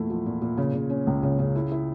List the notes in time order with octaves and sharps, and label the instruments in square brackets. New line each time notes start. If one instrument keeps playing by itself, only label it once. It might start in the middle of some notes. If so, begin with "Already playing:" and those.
Already playing: [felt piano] E2 A#2 A3 E4
F3
A#2
A#2
C#3
C#3
C#4
C#2
C#3
C#3
E4
E4